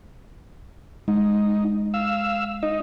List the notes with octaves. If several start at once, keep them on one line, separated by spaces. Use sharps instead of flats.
G#3 D#4
F5 E6
D#4 D#5